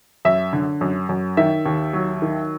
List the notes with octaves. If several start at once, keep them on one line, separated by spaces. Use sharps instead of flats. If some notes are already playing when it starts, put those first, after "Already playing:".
F#2 E5
D3
F#2
F#2
D#3 E5
D#2
F#3
D#3